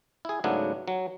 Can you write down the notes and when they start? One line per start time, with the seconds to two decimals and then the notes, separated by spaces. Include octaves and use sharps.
0.25 E4 G#4
0.44 G#2 C#3 F#3 A3 B3 D4
0.88 F#3